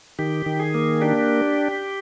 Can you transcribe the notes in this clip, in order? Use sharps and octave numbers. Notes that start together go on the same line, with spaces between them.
D#3 G4
D#3
G#4
A#3
D4 G4